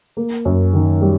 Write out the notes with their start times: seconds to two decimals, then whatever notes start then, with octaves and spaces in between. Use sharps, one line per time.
0.17 A#3
0.45 F#2
0.73 D#3
1.02 G3